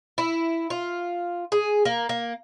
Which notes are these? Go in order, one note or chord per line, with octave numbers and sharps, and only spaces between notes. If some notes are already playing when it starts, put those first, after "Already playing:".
E4
F4
G#4
A#3
A#3